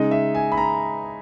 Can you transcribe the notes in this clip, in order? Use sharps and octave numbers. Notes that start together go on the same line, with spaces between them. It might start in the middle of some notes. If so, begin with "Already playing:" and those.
Already playing: C#3 G#3 D#4 D#5
E5
G#5
B5
A#5